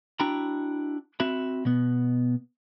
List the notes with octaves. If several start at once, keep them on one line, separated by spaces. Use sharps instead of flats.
D4 E4 F#4 G5 A#5 B5
C4 F#4 E5 B5
B2 B3